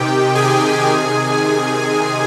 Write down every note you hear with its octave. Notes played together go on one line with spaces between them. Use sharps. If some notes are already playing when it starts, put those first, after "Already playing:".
Already playing: C3 D#3 G4 G5
G#4 G#5
C3 D#3